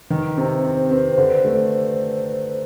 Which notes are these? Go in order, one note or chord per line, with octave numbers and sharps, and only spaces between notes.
D#3 B4
C3 C5
C4 C5
C4 B4
C5
D3 B4
A3